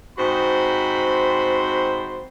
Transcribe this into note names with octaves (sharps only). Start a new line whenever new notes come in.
G#2 C4 F#4 C5 B5